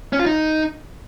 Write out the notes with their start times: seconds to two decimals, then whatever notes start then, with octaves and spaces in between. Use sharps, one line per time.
0.13 C#4
0.20 F4
0.26 D#4